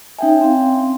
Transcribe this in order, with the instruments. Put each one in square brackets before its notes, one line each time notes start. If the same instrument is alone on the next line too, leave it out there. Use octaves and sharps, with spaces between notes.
[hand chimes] C#4 G5 G#5 [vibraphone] D#4 E5
[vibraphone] C4 F5